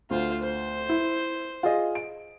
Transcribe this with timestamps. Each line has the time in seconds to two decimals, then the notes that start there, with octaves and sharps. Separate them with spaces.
0.11 D2 F4 C5
0.43 C5
0.89 E4
1.63 F4 G#4 D#5
1.95 D7